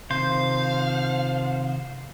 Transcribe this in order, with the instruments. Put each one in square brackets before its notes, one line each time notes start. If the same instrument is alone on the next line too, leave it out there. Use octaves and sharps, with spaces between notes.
[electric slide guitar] C3 D#3 [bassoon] F3 [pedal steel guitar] C5 [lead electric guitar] F5